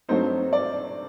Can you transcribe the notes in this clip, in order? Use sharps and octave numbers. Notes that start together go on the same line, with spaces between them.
G2 F#3 A3 C4 D#4 C5
D5